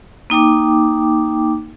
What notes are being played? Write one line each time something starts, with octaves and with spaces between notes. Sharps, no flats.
A#3 D#4 G5 D6